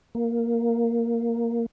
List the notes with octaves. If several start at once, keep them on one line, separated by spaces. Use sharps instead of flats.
A#3